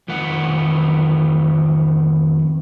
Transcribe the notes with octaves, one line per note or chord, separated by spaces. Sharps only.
F2 D#3 B4 F#5